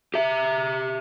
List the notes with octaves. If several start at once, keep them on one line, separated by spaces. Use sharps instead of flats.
G4 E5